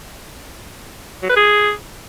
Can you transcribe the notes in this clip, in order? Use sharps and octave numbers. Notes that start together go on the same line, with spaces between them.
F#3
B4
G#4